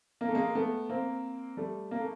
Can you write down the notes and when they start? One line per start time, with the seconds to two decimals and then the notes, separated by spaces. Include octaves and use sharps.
0.21 A#3
0.28 A3
0.35 G#3 A#3
0.55 A3 B3
0.89 A#3 C4
1.57 G3 A3
1.91 A#3
2.00 A3